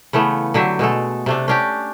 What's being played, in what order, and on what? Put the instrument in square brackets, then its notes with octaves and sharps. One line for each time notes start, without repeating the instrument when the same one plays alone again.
[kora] C#3 E3 A3 B3
D3 F#3 G4 E5
B2 G#3 A3 A4
C3 A3 D4
C#4 D4 G4